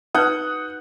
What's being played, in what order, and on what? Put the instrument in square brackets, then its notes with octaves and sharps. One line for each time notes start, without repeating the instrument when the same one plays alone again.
[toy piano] D#4 B4 [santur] F#5 [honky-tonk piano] D#6 F#6 G6